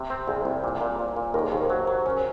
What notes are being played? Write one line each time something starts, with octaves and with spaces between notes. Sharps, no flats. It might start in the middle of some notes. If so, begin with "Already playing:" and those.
Already playing: C3 C5
C4
C2 G#4
C2
A#2
A#2
A#2
A#2
D#2 A#4
G#4
D#2 C5
A#4
F#3 C5
F#3
C#4 C5